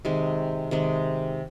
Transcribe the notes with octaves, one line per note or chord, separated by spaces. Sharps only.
C3 D#3 G#3
C3 D#3 G#3